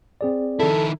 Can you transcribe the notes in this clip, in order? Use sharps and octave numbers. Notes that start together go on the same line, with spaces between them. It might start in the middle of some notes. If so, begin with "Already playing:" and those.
C4 G#4 D5
D#3 E4 A4